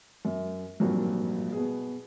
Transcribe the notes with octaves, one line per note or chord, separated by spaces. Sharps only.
F#2
G#1 G2 A#2 F3 F#3
B2 B3 G#4